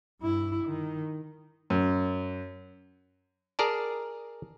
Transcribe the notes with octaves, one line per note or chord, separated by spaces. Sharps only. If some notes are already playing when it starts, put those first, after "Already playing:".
G2 E4
D#3
F#2
G#4 A#4 D5 A5